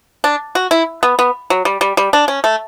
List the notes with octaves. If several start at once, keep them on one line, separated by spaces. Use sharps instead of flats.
D4
F#4
E4
B3
B3
F#3
G3
G3
G3
D4
C#4
A3